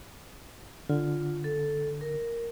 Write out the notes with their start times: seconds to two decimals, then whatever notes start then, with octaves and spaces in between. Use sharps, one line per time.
0.89 D3 F4
1.44 A4
2.01 A#4